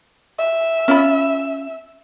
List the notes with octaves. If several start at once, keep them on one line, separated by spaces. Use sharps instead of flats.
E5
C#4 F4 B5